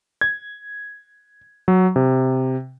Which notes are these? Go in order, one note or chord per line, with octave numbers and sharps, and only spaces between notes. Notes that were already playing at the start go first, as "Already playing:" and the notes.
G#6
F#3
C3